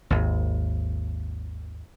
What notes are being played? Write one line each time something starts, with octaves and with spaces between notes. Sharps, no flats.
G#1 D#2